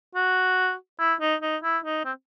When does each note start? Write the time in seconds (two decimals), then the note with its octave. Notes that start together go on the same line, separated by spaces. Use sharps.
0.15 F#4
0.99 E4
1.20 D#4
1.42 D#4
1.63 E4
1.84 D#4
2.05 C4